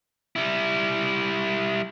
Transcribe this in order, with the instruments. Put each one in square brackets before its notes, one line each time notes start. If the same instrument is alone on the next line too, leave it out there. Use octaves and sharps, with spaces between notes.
[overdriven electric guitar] G3 E4